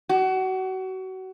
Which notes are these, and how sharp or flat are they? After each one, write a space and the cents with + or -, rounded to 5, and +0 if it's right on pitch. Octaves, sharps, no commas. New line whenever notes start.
F#4 +30